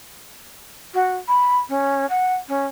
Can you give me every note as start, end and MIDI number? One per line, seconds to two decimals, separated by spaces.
0.94 1.17 66
1.28 1.58 83
1.69 2.06 61
2.10 2.34 78
2.48 2.66 61